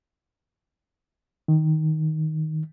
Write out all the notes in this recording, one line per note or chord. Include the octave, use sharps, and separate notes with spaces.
D#3